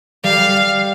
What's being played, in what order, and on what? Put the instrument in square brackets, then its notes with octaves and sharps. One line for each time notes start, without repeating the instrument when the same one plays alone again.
[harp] G3 [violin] F5